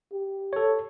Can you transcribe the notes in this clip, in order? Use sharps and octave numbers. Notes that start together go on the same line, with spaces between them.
G4
A4 C#5